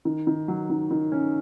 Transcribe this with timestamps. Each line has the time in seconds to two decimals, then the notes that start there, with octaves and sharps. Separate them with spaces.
0.05 D#3
0.27 D#3
0.48 F#3
0.70 D#3
0.91 D#3
1.12 C#4